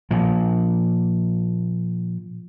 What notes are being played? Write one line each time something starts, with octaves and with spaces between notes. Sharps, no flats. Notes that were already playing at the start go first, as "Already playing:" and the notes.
A#2 F3